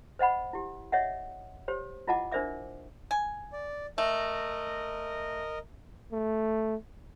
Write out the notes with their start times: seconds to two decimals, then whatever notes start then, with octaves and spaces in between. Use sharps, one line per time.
0.19 C5 D#5 F#5 B5
0.53 E4 G4
0.92 C#5 D#5 E5 F#5
1.68 G4 C5 C#5
2.07 E4 F4 D#5 F#5 A5 D6
2.31 D4 A#4 C5 D5 E5 D6
3.11 G#5
3.53 D5
3.98 A3 A#4 D#5
6.12 A3